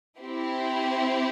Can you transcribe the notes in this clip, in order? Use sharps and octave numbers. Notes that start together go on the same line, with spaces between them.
C4 E4 G4